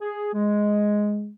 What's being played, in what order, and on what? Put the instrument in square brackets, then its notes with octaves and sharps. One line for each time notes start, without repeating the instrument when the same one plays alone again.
[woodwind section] G#4
G#3